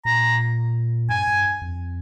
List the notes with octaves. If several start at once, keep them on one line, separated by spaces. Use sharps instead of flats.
A#2 A#5
G2 G#5
G2
F2